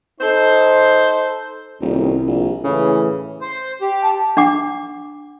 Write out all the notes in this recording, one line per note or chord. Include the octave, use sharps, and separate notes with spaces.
D#4 A4 C5
D#1 C2
A#1
A2 C#3 E3
C5
G4
A5
D4 F#5 D6